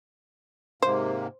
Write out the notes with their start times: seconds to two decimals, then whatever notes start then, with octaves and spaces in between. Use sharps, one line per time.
0.82 G#2 C3 A#3 C5